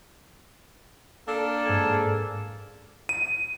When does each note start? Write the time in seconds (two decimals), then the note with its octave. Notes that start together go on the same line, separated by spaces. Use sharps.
1.28 A#3 D4 A4
1.65 G#2 G#5 G#6
3.09 D#7